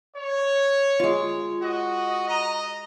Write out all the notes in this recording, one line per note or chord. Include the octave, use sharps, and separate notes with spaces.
C#5
G#3 F4
F#4 D#5
D#5 A#5